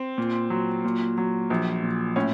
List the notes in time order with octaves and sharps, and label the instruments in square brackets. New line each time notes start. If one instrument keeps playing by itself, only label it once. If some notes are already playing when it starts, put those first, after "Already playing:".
Already playing: [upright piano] C4
[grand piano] A#2
F#3
A#2
F#3
A#1
A#2
[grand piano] A2 [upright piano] C#4